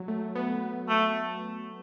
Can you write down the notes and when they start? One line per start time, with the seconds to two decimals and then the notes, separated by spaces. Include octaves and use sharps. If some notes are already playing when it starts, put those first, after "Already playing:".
Already playing: F#3
0.08 A3
0.35 B3
0.61 B3
0.89 A3